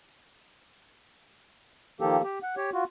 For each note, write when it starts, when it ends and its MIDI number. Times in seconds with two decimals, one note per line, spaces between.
2.01 2.22 51
2.01 2.22 53
2.01 2.22 58
2.01 2.22 67
2.01 2.22 69
2.24 2.39 67
2.43 2.55 78
2.57 2.70 67
2.57 2.70 73
2.73 2.84 65
2.73 2.84 66